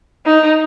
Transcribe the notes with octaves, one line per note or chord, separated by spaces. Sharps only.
D#4